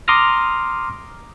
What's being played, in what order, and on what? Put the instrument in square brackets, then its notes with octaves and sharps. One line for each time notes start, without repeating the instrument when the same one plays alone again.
[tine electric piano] A#5 C6 D6 D#6 F6 A#6